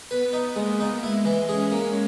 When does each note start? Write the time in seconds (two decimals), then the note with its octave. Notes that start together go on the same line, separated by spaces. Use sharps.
0.11 B3 B4
0.33 D#4
0.56 G#3 A#3
0.80 D#4
1.03 G#3 E4
1.25 E3
1.49 C#4 G#4
1.72 A#3